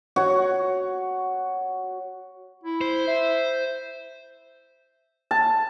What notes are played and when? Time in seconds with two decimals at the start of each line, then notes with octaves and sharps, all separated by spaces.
0.16 F#4 C#5
2.64 E4
2.81 C5
3.07 E5
5.31 A5